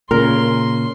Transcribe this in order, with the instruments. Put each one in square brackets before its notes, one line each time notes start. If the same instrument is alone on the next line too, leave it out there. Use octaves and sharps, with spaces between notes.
[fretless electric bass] A#2 C#3 [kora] A#4 [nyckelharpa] C6